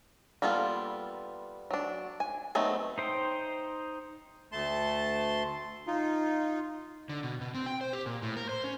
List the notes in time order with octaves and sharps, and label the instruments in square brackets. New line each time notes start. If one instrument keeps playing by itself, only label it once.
[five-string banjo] G3 A#3 B3 F4 A4
F#3 D4
G#5
F#3 A3 B3 C4 D#4
[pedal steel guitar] D#4 C5 G5
[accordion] D2 A3 A5 C6
D#4 F4
[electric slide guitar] D3
B2
B2
C4
G5
C5
G4
A#2
A2
A#4
C5
C#4